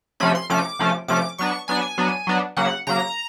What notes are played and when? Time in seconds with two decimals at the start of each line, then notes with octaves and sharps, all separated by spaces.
0.20 C3 F3 A3 C#4 B5
0.35 C6
0.50 C3 F3 A3 C#4 D6
0.79 C3 F3 A3 C#4
1.08 C3 F3 A3 C#4 D6
1.38 F#3 B3 D4 C#6
1.68 F#3 B3 D4 G#5
1.98 F#3 B3 D4
2.27 F#3 B3 D4
2.57 C#3 F#3 A#3 F#5
2.87 C#3 F#3 A#3 A#5